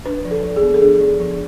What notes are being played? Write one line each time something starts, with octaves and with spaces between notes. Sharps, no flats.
D4 B4
F3
A4
F3
G#4
B3
A4
D4 G#4
F3
F3